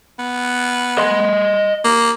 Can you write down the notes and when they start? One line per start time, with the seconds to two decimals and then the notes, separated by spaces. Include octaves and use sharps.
0.19 B3
0.98 D#5 C6
1.85 A#3